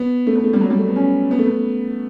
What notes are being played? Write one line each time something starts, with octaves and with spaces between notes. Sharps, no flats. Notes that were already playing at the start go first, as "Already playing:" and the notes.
Already playing: B3
A3
B3
A3
G3
F#3
G3
A3
B3
C#4
B3
A3
B3